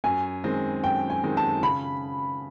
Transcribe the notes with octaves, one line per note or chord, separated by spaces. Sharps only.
F#2 G#5
D#3 G#3 C4
F#2 G5
G#5
D#3 G#3 C4
A5
C#3 B5